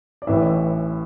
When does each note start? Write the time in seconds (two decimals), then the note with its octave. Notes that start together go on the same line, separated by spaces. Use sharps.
0.22 D5
0.27 A1 A2 E3 B4 E5